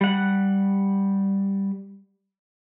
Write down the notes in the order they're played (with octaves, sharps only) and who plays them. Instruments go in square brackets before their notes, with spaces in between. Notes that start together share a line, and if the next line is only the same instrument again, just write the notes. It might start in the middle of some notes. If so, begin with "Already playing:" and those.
[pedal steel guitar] G3 F#5